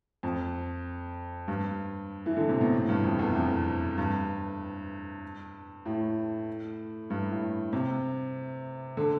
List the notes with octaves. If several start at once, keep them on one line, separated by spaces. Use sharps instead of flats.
F2
G2
E3
D3
C3
B2
A2
G2
F2
E2
F2
G2
A2
G2
A2
C3
D3